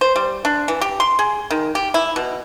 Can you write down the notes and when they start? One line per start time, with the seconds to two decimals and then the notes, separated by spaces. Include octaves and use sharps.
0.01 C5
0.16 G3
0.45 D4
0.68 E3
0.81 G4
1.00 C6
1.19 G#4
1.51 D#3
1.75 G4
1.94 E4
2.16 B2